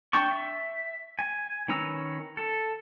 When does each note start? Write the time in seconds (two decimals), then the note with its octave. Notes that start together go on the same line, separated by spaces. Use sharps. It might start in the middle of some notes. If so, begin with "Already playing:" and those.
0.13 D4 G5 A5 C#6
0.31 E5
1.19 G#5
1.68 D#3 C#4 B4 A#5 E6
2.37 A4